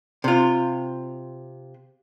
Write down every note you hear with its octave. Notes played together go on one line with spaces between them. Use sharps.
C3 F4